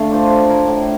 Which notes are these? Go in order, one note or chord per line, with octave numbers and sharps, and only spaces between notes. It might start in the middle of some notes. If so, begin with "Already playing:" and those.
Already playing: D3 A3 F5
D4 F4 C5
A3
E4 A#4
A2